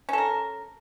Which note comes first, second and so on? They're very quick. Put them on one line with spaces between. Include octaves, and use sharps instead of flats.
C#4 A4 A#4